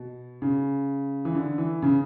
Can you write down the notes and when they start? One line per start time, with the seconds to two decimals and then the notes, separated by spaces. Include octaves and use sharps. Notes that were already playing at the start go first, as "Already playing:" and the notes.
Already playing: B2
0.42 C#3
1.25 E3
1.35 D3
1.58 E3
1.82 C#3